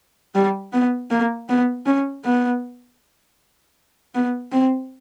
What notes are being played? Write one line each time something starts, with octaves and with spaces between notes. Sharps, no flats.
G3
B3
A#3
B3
C#4
B3
B3
C4